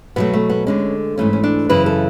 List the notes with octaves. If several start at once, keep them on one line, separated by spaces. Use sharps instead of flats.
B2 F#3 A3 B3
A3
B3
D2 D3 G#3 C#4
G#2 E3 A3 C#4
C#4
D4
F#2 C#3 E3 B4
A4